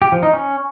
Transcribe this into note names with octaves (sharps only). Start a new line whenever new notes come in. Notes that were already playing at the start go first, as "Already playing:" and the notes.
G4
F3
D#4
C#4